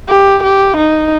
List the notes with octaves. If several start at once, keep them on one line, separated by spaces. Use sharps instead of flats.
G4
G4
D#4